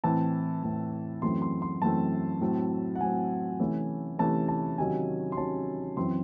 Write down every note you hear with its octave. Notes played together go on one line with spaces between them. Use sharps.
A2 E3 C4 A5
A2 E3 C4
F#2 E3 A3 C4 C6
C6
C6
F#2 E3 A3 C4 A5
A2 F#3 C4
F#5
A2 F#3 C4 G#5
C3 E3 A3 C#4
C3 E3 A3 C#4 A5
A5
C3 D#3 F#3 C#4 G#5
C6
C3 D#3 F#3 C#4 A5
F#2 E3 C4 C6